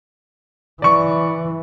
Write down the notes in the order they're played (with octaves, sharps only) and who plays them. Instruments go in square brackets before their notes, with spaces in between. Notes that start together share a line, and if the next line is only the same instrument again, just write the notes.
[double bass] E3 [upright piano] D5 C#6